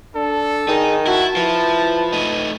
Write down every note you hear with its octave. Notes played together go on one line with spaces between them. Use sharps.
D4 A4
D#3 D#4 G#4
E4 F#4 A5
F3 E4 B4
A3 D#4